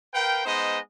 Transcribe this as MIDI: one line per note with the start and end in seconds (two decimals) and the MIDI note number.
0.14 0.42 70
0.14 0.42 71
0.14 0.42 77
0.14 0.42 79
0.45 0.79 56
0.45 0.79 59
0.45 0.79 63
0.45 0.79 72
0.45 0.79 75